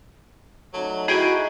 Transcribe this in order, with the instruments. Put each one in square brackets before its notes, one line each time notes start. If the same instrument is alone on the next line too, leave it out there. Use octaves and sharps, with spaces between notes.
[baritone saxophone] F#3 [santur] A3 D#4 D5
[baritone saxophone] E4 [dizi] F#4 [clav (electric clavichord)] G#4 G5 G#5 [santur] B4 D#5 A#5